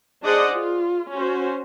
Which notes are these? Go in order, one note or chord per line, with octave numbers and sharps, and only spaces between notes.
D4 G#4 C5 D5 D#5 F#5
F4
C#4 F#4 C5